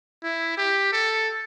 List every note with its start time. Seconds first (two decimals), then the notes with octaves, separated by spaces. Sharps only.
0.23 E4
0.57 G4
0.92 A4